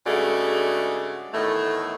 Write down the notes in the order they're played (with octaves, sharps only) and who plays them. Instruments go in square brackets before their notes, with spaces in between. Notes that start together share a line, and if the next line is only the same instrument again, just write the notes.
[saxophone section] G2 C#3 G#3 A3 F#4 D5
E2 A2 D#3 A3